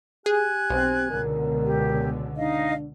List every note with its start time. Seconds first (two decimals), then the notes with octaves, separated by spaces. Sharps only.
0.26 G4 G#4 G#5 F#6 G#6
0.70 B1 C4
1.10 C#2 B2 D3 A#4
1.64 G4
2.37 D4 D#4 D#5 F5